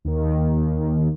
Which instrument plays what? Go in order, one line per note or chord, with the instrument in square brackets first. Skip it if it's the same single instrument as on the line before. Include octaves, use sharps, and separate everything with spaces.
[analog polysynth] D#2 D#3